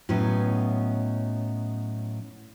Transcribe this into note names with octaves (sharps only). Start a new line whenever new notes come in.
A2 F#3 B3 C#4 D#4